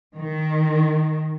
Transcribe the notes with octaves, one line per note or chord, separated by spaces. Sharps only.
D#3